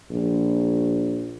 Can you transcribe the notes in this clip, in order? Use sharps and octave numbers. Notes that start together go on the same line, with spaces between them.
A#1